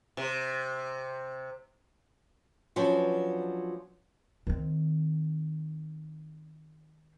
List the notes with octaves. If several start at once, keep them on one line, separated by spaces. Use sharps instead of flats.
C3
F3 F#3 B3 C#4 D4
D#3 C4